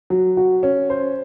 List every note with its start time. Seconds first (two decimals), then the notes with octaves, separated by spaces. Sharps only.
0.10 F#3
0.37 F#4
0.63 C#4
0.90 C5